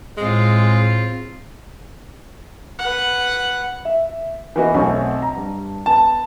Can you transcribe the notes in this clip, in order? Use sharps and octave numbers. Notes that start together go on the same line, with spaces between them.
A2 G#3 C4 F4 G#4
B4 F#5
E5
E3 A#3 B3 F#4 B4 D#5
B1 F#3 A3 C4 G#5 C#6
A#5
G2
B3 A5